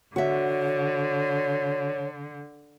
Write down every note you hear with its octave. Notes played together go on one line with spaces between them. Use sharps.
D3 F#4 C#5 E5